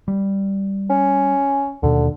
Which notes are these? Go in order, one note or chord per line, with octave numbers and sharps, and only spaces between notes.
G3
C#4
D#2 B2 D3